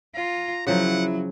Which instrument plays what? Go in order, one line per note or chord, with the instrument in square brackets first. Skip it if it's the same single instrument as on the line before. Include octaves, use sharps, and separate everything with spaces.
[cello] F4 [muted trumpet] A#5
[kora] C#3 F3 A#4 [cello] F#3 [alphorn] E4 [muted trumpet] F#5